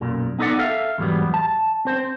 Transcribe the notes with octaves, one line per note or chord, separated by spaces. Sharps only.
B1 F#2 A#2
B3 D#4 A4 B4 D5 F#5
A4 E5 F5
E2 G#2 F#3 G3 B3
A5
C4 C5